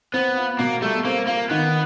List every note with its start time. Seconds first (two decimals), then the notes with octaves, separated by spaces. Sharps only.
0.13 B3 C4
0.37 F4
0.59 B2 A#3
0.82 G3 A3
1.05 A#3 C4
1.27 A#3 F4
1.50 D#3 B3